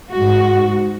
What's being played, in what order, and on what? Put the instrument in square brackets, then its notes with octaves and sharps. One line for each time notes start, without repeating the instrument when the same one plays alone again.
[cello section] G#2 F#4